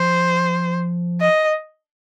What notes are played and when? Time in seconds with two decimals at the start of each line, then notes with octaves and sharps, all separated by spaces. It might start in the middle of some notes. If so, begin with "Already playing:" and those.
Already playing: F3 C5
1.21 D#5